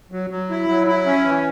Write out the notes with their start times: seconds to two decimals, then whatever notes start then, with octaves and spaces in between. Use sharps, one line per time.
0.12 F#3
0.30 F#3
0.50 E4
0.68 F#3
0.87 E4
1.06 C#4
1.24 E3